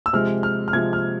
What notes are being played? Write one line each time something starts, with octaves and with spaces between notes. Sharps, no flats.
E6
C3 F3 G#3 F6
F6
F6
C3 F3 G#3 G#6
F6